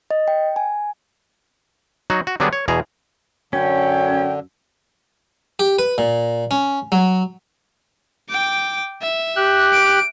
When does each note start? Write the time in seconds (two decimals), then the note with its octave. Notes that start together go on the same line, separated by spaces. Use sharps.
0.11 D#5
0.28 G5
0.56 G#5
2.10 F#3 D#4 F#4
2.27 F#4
2.40 D3 F#3 G3 B3 D4 G#4
2.53 C#5
2.68 E2 B2 G#4 A#5
3.53 F#2 D3 C#4 G5
5.59 G4
5.79 B4
5.98 A#2
6.51 C#4
6.92 F#3
8.29 G5 D6
9.02 E5
9.36 G4 F#6
9.72 D7